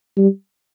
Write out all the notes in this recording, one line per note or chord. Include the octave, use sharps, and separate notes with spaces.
G3